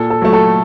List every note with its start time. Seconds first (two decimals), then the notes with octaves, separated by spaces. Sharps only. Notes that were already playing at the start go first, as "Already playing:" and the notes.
Already playing: A#2 A4
0.10 A4
0.22 F#3 A3
0.33 A4